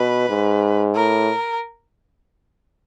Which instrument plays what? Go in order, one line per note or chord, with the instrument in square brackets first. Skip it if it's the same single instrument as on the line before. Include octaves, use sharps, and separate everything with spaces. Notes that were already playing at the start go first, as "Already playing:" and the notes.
Already playing: [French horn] B2 [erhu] B4
[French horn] G#2
[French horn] A2 [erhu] A#4